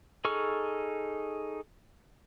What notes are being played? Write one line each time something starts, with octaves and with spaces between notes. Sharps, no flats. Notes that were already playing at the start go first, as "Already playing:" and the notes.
D#4 G#4 A4 C#6 F6